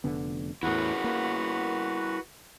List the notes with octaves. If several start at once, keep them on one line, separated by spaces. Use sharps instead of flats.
F1 D3 B3
E2 A2 E4 F#4 G#4 A#4 B4 F#5
A#3